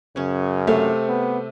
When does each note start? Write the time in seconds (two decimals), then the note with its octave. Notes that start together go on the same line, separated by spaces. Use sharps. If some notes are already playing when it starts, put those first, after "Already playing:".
0.16 F#2 C#3 C#4
0.67 C3 A3 F5
1.09 B3